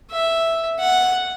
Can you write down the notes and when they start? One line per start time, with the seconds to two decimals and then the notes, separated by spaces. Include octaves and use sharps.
0.11 E5
0.79 F#5